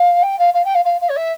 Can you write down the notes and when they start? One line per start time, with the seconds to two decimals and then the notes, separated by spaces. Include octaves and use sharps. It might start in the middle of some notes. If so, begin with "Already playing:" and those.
Already playing: F5
0.22 G5
0.38 F5
0.53 F5
0.65 G5
0.74 F5
0.84 F5
1.01 F5
1.09 C#5
1.16 E5